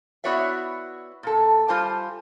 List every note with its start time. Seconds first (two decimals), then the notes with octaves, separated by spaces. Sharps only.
0.24 B3 E4 F#4 C#5 D5 E5
1.23 A#2 A4
1.68 G3 F4 G4 C5 G#5 A5